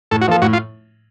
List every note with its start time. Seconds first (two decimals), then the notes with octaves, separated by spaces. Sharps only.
0.11 A2 A4
0.21 F#4
0.28 F3 A#3 F4 A4
0.42 A2 F#4
0.53 F4